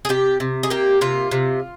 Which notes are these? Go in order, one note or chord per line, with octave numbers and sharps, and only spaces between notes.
G#4
C3 G4
C3
G#4
A#3 G4
C3 F4
C3